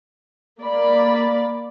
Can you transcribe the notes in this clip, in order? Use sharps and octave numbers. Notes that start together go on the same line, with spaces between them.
A#3 D5 B5